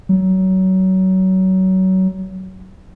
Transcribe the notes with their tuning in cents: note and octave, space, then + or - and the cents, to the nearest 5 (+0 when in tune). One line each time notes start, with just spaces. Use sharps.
F#3 +25